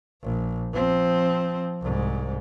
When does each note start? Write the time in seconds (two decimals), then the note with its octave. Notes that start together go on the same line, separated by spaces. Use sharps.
0.23 A#1
0.73 F3 C4
1.81 C2 G#2